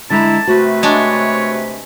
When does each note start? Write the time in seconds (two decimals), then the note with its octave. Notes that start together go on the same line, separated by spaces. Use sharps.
0.10 D3 G#3 E4 A5 A#5
0.47 C3 A3 F#4 B4
0.83 G#3 D4 C#5